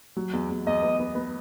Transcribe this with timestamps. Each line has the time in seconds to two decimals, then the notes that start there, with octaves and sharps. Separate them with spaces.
0.17 F#3
0.33 E2
0.50 E2
0.67 E2 D#5
0.83 B3
1.00 B3
1.15 B3